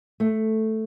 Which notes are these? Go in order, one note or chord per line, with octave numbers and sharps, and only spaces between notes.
A3